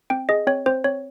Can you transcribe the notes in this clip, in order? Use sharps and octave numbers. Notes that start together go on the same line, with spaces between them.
C4 G5
G#4 D#5
C4 C#5
C4 C5
C4 C#5